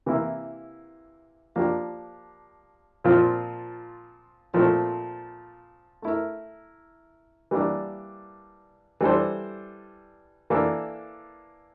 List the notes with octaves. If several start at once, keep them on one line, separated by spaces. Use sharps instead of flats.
C3 E3 A#3 E4
F3 A#3 D4 G4
A#2 F3 C4 F4
A#2 F3 A3 C4
A3 E4 A#4
E3 G3 A#3 D4
E3 G3 D4 A4 C5
E3 A#3 D4 A4